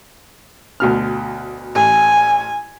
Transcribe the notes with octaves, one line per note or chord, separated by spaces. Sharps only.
D2 B2 F6
A1 G#5